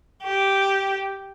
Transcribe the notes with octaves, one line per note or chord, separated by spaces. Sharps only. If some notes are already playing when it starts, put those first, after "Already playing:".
G4